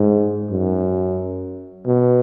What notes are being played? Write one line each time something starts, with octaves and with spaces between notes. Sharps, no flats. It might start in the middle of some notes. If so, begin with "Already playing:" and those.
Already playing: G#2
F#2
B2